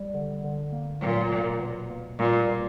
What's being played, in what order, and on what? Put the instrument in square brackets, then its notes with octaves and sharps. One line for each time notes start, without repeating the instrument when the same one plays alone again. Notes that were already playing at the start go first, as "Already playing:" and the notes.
Already playing: [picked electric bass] G3
D3
D3
A#3
[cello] A#2 [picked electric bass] F#3
[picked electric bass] B2
B2
A#3
[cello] A#2 [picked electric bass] G3
[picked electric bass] B2